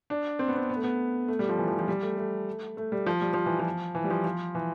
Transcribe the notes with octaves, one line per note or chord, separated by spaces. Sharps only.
D4
C4
B3
C4
B3
A3
B3
A3
G3
F3
E3
F3
F3
G3
A3
A3
A3
G3
F3
G3
F3
E3
F3
E3
G3
F3
F3
E3